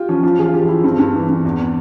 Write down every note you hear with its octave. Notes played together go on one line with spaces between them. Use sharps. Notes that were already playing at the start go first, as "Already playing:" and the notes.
Already playing: F4 G4
F3 C#4
F3 F4
F3 G#4
F4
F3 G4
F3 E4
G2 C4
G2
E3
G2
E2